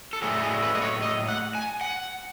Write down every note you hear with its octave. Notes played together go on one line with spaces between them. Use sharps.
A4
A2 F#3 A3 E4 G#4
G#4
B4
D#5
C#5
D#5
F#5
G#5
F#5